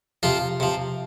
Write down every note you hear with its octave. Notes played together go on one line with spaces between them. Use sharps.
C3 F3 F4
C3 F3